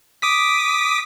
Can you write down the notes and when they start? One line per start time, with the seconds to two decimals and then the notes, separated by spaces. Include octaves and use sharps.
0.22 D6 D#6 B6